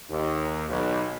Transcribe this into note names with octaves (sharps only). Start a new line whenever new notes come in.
D#2
B1